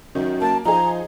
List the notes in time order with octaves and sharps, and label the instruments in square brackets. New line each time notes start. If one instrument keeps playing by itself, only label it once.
[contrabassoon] F#2 [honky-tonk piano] D#3
[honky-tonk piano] A#3 [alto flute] A5
[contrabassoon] F3 [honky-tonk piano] D#4 G#4 [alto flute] A#5